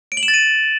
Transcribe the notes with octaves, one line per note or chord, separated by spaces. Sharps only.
D7
F#7
E7
A6
D#7